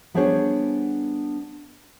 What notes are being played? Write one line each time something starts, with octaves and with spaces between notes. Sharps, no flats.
G3 B3 D4 G#4 C5 C#5